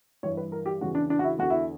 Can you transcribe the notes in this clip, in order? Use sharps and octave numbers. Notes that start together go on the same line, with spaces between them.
G2 E3 C#5
B4
A#4
G4
E2 C#3 E3 F#4
D4
D4
F#4
E4
E2 D3 F#4
E4